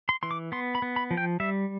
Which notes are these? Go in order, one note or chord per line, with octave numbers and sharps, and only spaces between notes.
C6
E3 C6
D6
B3 C6
B5
B3
B5
F3
G5
G3 E5